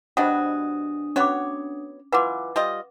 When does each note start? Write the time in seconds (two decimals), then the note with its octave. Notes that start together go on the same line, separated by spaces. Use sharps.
0.17 B2 G3 D4 F#4 C5 D#5 F#5 D#6
1.16 B3 C#4 F#4 C#5 D6
2.12 E3 F4 B4 F#5 D6
2.56 G3 F4 D#5